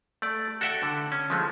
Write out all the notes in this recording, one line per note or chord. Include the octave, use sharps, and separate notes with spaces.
A3 D5
F#4 A4 D5 E5 F#5 G5
D3
C#4
F3 G#3 A3